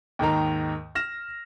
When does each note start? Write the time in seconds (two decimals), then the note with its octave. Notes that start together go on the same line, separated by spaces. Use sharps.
0.19 D#2 G#2 D#3 A#5
0.95 F6 A#6 E7